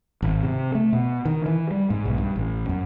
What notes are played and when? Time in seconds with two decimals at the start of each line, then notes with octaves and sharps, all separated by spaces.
0.22 G#1
0.43 C3
0.75 A3
0.93 B2
1.25 D#3
1.46 E3
1.71 G3
1.90 G#2
2.05 B1
2.18 G2
2.36 A1
2.69 F#2